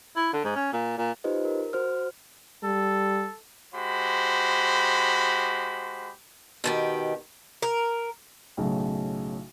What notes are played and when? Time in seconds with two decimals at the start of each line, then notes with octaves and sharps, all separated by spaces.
0.16 E4
0.33 D3
0.44 G#2
0.55 C#4
0.73 A#2
0.97 A#2
1.24 D#4 F4 G4 B4 C5 D#5
1.45 A#4
1.73 F#4 C5 F6
2.64 G3 A4
3.75 G#3 F#4 G4 C5 B5
6.64 B2 D#3 G4
7.62 A#4
8.57 B1 A2 C#3